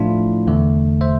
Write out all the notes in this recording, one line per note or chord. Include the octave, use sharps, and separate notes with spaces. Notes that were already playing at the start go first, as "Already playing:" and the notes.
Already playing: A2 F3 A3 D4 E4 F4
E2 D3 A3
C5 E5